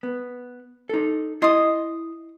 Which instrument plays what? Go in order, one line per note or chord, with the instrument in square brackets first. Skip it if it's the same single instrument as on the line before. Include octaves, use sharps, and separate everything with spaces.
[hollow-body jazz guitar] B3
D#4 A4
[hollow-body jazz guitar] E4 C6 [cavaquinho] D#5 D#6